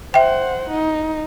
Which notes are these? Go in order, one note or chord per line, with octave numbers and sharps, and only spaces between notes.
C5 E5 F#5 G5
D#4